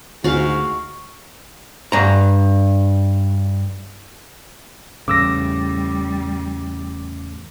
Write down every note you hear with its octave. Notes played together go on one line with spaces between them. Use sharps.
D2 G#2 F#4 F5
G2 A#5
E2 A2 C#3 G3 D6 E6 A#6